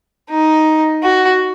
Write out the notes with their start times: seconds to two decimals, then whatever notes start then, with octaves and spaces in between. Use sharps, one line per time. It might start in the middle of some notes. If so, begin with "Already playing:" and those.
0.30 D#4
1.02 F#4